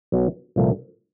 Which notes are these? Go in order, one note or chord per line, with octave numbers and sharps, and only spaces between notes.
B1 B2 F#3
C2 A#2 F3 A3